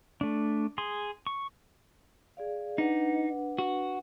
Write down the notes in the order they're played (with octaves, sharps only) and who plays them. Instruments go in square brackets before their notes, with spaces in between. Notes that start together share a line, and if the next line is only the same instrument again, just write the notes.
[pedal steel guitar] A3 D4
G#4 C6
C#6
[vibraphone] G#4 D5 F5
[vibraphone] D4 B4 F#5 [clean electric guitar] D#4
[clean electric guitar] F#4